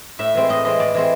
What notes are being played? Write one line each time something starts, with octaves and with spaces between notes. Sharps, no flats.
A2 E5
E3 G#3 C4
A2 D#5
E3 G#3 C4 D#5
A2 D5
E3 G#3 C4